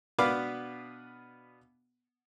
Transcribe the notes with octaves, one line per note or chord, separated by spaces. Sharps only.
B2 B3 D4 B4 F5 D6